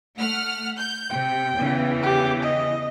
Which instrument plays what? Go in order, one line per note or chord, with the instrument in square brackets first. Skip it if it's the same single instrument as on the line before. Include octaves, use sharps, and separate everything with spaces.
[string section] A3 F#5 F6
G6
[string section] C3 [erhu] G5
[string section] E2 C#3 E3
[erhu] G4
D#5